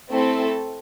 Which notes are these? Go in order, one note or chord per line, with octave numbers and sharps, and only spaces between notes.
A3 C4 E4 A4